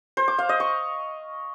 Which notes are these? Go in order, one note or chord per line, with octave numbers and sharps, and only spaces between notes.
C5
D6
F5
D#5
C#6